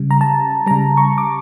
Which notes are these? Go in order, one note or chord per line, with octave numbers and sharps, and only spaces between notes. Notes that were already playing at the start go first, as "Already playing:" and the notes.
Already playing: C#3 G3
A#5
A5
C#3 G3 A#5
C#6
D6